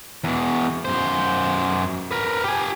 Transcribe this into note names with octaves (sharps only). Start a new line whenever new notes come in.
E2 B2
F#2 C5
A#4 B4
G4 G#5